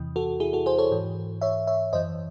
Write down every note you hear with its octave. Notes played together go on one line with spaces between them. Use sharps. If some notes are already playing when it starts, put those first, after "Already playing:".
Already playing: E2 C3 E3
F#4 A4
E4 G#4
F#4 A4
G#4 C5
A4 C#5
G#2 E3
C#5 E5
C#5 E5
F#2 E3 C5 D#5